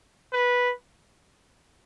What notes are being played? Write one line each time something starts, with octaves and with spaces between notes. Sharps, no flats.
B4